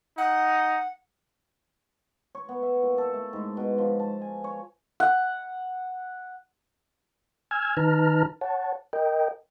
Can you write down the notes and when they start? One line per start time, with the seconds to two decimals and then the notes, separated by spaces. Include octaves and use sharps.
0.18 D#4 F#5
2.35 C#5
2.49 B3
2.63 E5
2.82 A#2
2.98 A4
3.13 A3
3.33 G#2
3.57 B2
3.78 F3
4.00 A5
4.22 G#5
4.44 C#5
5.00 F#5
7.51 G#5 E6 F6 G#6
7.77 D#3 D#4 B4 A5 A#5 F6
8.41 C#5 F#5 A5
8.93 A#4 D#5 G5